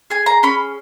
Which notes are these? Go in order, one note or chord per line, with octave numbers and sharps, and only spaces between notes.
G#4 G#5
A#5
C#4 B5